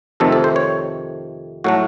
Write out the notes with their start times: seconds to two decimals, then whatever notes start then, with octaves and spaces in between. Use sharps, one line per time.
0.20 F2 C3 D#3 A3 A4
0.32 A4
0.44 C5
0.56 C#5
1.64 A2 F#3 A3 F#4